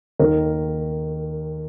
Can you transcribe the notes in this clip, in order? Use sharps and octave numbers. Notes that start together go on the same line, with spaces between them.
D#2 D#3 A#4